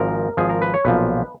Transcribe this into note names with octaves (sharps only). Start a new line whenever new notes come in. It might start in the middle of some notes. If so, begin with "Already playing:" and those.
Already playing: G#1 G#2 F3 A#4
G#1 G#2 F3 G#4
A#4
B4
C#5
B1 A#2 F3 B4